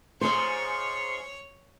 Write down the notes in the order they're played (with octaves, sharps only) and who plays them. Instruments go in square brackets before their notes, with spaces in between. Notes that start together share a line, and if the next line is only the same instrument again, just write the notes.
[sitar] G#2 F3 G#3 [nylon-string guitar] C5 [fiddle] C#5 [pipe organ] C6 C#6